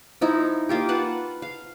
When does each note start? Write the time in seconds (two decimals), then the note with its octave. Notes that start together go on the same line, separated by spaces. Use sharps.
0.21 F3 D#4 E4
0.69 A#3 F4 G4
0.88 F4 B4 F#5 A5
1.42 F5